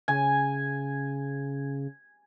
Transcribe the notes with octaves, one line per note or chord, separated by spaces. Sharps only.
C#3 G#5